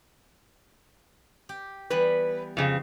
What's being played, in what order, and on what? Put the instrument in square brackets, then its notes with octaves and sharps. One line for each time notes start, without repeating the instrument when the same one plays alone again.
[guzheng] G4
[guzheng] E3 G3 B3 [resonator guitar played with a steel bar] B4
[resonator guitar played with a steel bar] F2 C#3 C4